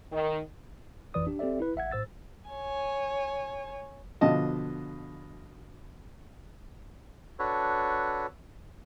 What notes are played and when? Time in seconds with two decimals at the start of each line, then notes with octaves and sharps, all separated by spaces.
0.12 D#3
1.14 G#1 F2 E3 B4 D5 D#6
1.27 D4 G4
1.39 C4 G4 A4 D5 E5
1.60 E4 B4
1.76 A1 E5 F#5 G#6
1.91 A2 C5 E6 A6
2.49 C#5 G#5
4.21 B2 D3 F3 D#5 A5
7.39 D4 F#4 A4 B4 C#5